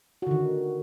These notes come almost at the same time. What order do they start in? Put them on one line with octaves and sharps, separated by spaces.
F#4 D3 D#3